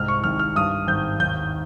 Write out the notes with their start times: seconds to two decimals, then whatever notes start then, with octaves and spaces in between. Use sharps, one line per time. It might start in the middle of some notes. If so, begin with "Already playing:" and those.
Already playing: C2 G#2 F6
0.08 C#6
0.24 G#1 F6
0.39 F6
0.56 G2 D#6
0.87 G#1 G6
1.20 D#2 G6